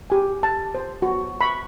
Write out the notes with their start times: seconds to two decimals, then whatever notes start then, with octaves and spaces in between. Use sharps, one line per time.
0.10 G4 G#5
0.43 A5
0.75 C5
1.02 F#4
1.41 B5 C#6